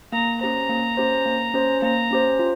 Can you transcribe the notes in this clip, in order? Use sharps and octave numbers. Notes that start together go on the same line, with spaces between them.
A#3 A#5
C#4 G4 C5 A#5
A#3
C#4 G4 C5
A#3
C#4 G4 C5
A#3 A#5
C#4 G4 C5
F4